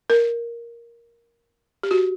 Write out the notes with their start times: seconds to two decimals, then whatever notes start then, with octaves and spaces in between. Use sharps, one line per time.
0.10 A#4
1.83 G4
1.91 F#4